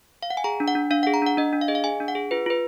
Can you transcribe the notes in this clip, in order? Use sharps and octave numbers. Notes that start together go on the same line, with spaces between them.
F5
F#5
G#5
G#4 A#5
D4
F#5
D4
D4 F5
F#5
G#4
A#5
D4 F#5
D4 D#5
D4
F5
G#4 D#5
F5
G#4 G#5
D4
F#5
G#4
F4 B4
F4 B4